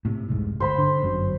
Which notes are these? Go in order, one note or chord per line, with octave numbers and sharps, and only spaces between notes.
A2 C3
F1 C2 G#2
G1 C5 B5 C6
D3
G1 F#2 F#3